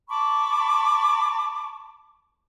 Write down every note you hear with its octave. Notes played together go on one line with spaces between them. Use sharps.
A5 B5 C#6 D6